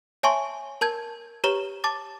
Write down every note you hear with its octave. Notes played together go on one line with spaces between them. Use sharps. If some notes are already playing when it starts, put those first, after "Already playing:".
C#5 E5 G#5 A5 C6 C#6
A#4 A5 G6 G#6
G4 B4 C#5 A#5 E7 G7
A5 D6 A6